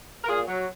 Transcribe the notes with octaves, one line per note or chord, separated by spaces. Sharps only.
A#4
A#2 F4 G#4
F#3